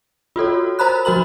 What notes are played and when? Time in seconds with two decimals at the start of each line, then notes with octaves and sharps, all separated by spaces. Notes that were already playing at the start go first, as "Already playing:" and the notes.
0.36 F4 F#4 A4 C#5
0.79 A#4 C5 A#5 B5 F#6
1.05 F3 F#4 A#4 B5 F#7